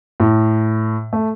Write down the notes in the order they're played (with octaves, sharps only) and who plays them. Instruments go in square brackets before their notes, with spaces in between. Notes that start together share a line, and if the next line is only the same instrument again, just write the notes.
[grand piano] A2
A3